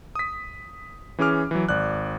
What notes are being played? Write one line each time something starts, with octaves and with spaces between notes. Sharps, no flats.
D#6 B6
E3 C#4 G#4 D6 F6
E3 F#3
G#1 D5 F#6